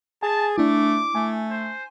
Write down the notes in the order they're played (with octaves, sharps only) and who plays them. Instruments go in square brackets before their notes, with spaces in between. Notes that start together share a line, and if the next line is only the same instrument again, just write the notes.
[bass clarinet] G#4 [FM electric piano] G#5 A6 [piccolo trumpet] A5
[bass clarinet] A3 [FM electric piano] D4 E4 [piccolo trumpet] D6
[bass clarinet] A3 [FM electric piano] G#5
[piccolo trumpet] C5